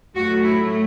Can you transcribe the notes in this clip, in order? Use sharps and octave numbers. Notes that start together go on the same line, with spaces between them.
A2 F#3 A3 F#4
E4